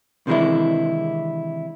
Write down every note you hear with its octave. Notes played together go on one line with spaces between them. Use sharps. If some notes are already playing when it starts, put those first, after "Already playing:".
C3 D#3 E3 G#3 D4 E4